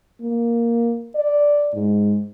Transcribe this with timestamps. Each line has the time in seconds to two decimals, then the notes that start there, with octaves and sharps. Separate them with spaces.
0.21 A#3
1.15 D5
1.74 G#2